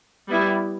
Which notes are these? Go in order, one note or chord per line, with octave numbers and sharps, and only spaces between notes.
G3 B3 E4